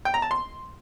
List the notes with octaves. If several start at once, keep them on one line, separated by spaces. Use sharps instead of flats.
G5
A#5
A5
C6